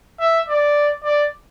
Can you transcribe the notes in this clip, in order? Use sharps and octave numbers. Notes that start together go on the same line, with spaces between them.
E5
D5
D5